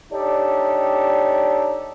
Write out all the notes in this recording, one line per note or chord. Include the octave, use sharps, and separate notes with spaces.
D4 D#4 G4 A4 C#5 D5